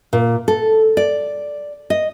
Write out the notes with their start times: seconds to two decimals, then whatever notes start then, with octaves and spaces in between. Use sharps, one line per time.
0.13 A#2
0.48 A4
0.97 D5
1.90 D#5